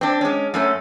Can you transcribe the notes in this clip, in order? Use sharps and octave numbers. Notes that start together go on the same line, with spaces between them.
C4 D4
G#3 C#4
F#2 A3 C#4